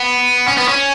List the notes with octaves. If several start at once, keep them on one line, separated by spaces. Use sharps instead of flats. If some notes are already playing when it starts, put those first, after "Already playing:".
Already playing: B3
C#4
B3
C#4